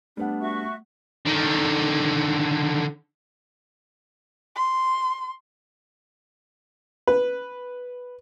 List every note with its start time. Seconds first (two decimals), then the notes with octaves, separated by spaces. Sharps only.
0.17 G3 A3 B3 D4 F#5
0.40 F#4 E5 C#6
1.26 D3 D#3
4.56 C6
7.07 B4